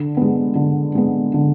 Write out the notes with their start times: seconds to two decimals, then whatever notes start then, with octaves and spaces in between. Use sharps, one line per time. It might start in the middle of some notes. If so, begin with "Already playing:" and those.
Already playing: D3
0.17 G#3 B3
0.55 D3
0.95 G#3 B3
1.34 D3